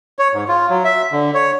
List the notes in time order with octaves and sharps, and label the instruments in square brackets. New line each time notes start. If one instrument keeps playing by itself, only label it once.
[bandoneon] C#5
G#2
F4
F#3
E5
D3
C#5